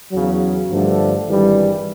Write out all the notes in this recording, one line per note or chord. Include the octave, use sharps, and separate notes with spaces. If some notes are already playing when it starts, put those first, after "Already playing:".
E2 C#3 F#3
G2 D3 F3 A3
G#1 G2 E3 G3